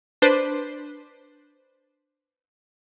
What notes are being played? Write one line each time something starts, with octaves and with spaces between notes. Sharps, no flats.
D4 B4 C5